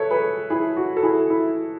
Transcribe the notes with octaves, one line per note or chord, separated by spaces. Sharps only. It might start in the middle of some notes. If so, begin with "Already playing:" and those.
Already playing: A4 B4 C#5 E5
G#4 B4
E4 G#4
F#4
A4
E4 G#4
E4